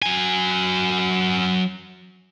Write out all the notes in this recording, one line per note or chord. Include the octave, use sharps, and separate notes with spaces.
F#3 G#5